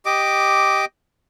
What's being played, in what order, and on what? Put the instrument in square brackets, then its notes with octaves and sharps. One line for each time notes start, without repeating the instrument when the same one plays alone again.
[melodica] G4 D#5 D6